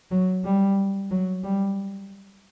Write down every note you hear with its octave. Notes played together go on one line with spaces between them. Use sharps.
F#3
G3
F#3
G3